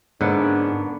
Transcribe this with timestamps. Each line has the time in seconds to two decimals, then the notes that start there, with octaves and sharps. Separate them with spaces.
0.21 G#2 D3 A#3 B3 C#4 D4